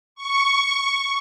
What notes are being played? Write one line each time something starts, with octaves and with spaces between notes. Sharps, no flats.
C#6